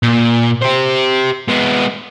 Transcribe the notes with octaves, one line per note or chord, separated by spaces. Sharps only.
A#2
G4 C5
G#3 B3